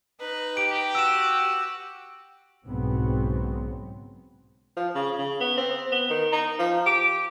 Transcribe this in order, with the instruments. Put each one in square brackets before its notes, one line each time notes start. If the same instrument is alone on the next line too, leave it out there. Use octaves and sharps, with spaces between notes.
[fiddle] D#4 B4
[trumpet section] G4 [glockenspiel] D7
[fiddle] F#4 [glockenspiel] E6 E7
[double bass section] B1 G#2 C#3 F#3 B3 C4
[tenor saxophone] F3
C#3
C#3
B3
C4
B3
D#3
D#4
F3
G4